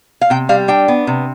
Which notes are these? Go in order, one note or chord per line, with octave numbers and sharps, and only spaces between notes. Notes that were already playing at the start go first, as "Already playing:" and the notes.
F5
C3 G5
G3 F5
D4 G5
B3
C3